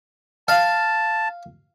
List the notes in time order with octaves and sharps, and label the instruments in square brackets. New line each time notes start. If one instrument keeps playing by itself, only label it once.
[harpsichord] F5 [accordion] A5